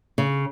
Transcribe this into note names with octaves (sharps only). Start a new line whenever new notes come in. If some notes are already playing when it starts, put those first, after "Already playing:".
C#3